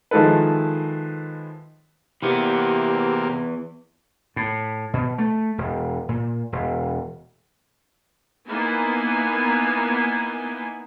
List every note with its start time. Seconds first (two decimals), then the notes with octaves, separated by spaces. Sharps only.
0.11 D#3 F3 G#3 E4 A4 B4
2.22 C3 E3 A#3 B3 E4 G4
4.36 A2
4.93 B2
5.18 A3
5.58 E1
6.09 A#2
6.52 E1
8.48 A#3 B3 D#4 E4 G#5